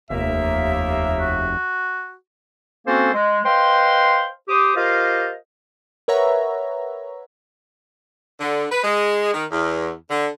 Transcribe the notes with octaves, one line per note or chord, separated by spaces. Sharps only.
F1 D#2 A#3 E5
F#4
A#3 C4 C#4 F#4 A4 C5
G#3
B4 C5 D#5 F5 G5 C6
G4 C5 D6 D#6
F4 G4 A#4 C5 D#5 F5
A#4 B4 C#5 E5 F#5 A#5
D3
B4
G#3
D#3
E2
D3